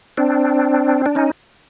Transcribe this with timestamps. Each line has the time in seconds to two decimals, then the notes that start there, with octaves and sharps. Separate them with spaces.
0.17 C4 D4
1.06 D4
1.15 C#4 D#4